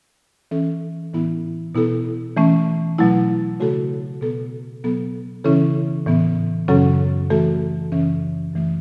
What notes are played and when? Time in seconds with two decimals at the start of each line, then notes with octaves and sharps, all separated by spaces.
0.51 E3 C#4 A4
1.13 A2 E3 B3 E4
1.75 B2 B3 E4 A4
2.37 E3 A3 C#4
2.98 B2 F#3 A3 E4
3.60 C#3 A3 F#4 A4
4.21 B2 B3 A4
4.83 B2 F#3 B3 A4
5.44 C#3 E3 C#4 E4 A4
6.06 A2 E3 B3
6.68 F#2 C#3 F#3 C#4 A4
7.30 E3 A3 F#4 A4
7.91 F#2 C#3 E3 C#4
8.53 F#2 E3 A3